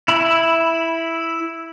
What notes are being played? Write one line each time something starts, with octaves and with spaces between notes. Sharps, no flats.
E4 B5